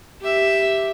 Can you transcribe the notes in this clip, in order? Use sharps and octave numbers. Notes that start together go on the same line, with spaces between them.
G4 E5